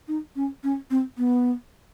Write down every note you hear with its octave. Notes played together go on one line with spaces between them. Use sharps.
D#4
C#4
C#4
C4
B3